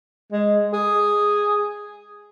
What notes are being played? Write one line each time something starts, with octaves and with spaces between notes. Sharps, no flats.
G#3
G#4